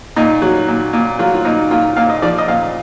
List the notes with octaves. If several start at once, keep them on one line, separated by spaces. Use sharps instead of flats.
A#2 D#4
F#3
A#2
A#2
F#3 F4
F4
A#2 D#4
A#2 F4
A#2 F5
D#5
F3 D5
D#5
A#2 F5